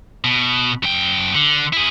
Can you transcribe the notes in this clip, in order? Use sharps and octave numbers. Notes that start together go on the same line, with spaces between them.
B2
F#2 G5
D3
E4 G#4